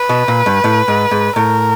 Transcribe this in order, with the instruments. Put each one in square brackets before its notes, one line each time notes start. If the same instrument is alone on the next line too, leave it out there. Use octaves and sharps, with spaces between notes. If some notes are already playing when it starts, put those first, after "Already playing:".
Already playing: [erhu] B4
[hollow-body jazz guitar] B2
A#2
G2
A2
G#2
G#2
[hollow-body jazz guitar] A2 [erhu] A#4